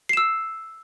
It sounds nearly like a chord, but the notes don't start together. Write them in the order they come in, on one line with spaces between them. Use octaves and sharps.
C7 E7 E6